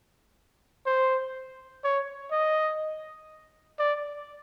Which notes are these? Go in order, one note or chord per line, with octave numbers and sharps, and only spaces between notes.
C5
C#5
D#5
D5